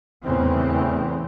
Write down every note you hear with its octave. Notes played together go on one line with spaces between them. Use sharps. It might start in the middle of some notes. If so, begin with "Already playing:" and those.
E2 A2 C#3 E3 C4